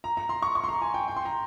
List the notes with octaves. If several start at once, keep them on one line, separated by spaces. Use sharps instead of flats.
A#5
A#5
C6
C#6
C#6
C6
A#5
G#5
G5
G5
C6
A#5